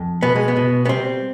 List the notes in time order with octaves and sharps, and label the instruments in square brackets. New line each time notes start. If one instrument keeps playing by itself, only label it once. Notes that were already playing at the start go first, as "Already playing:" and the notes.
Already playing: [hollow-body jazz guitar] F2
B2 B3
G#3
B3
B2
B3
G3 C4